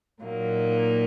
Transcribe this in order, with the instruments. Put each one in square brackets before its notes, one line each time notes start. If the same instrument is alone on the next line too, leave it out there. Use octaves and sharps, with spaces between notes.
[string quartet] A#2 F#3 A#3 D#4